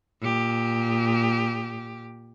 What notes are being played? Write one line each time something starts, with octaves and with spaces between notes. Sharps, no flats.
A#2 G4